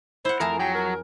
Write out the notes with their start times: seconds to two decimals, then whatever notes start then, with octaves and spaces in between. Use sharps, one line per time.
0.25 E4 C5 F#5
0.40 F2 A3 G#4 A#4 A5
0.59 F#3 G5
0.74 A#4